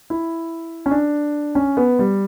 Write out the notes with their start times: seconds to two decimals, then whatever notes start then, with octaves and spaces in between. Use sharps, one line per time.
0.10 E4
0.86 C#4
0.91 D4
1.55 C#4
1.77 B3
1.99 G3